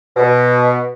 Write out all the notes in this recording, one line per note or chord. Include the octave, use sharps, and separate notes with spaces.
B2